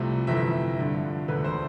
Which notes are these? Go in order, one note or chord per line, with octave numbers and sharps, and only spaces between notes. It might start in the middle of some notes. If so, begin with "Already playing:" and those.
Already playing: C2 C3 F3 A3
G1 F2 C3 E3 E5
G1 G2 D3 F3
E1 D2 D3 A3 B4
C5